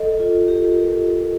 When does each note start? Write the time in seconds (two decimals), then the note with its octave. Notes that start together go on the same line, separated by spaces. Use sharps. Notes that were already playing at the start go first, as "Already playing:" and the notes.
Already playing: A4 D#5
0.20 F4
0.48 G4
0.78 A#4